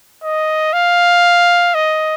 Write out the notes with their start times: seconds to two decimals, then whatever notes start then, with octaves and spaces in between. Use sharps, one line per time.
0.23 D#5
0.73 F5
1.75 D#5